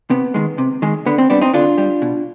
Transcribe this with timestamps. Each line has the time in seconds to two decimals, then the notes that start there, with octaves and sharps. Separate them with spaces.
0.10 C3 B3
0.34 D#3 G#3
0.58 C3
0.82 D#3 G#3
1.06 D3 B3
1.18 C4
1.30 G3 B3 D4
1.41 C4 D#4
1.54 D3 D4 F4
1.78 G3
2.02 B2